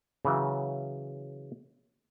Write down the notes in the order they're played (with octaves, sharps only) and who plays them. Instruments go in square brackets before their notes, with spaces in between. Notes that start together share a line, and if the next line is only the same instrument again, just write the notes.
[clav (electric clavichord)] C#3 E3 F#3